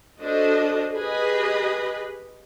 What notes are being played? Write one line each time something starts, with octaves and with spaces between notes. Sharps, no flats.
D4 F#4 A4 C5 D#5
G4 G#4 B4 D#5 B5